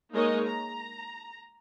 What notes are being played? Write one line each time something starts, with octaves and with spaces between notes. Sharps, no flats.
G#3 A#3 D#4 A#4 C#5 D#5
A#5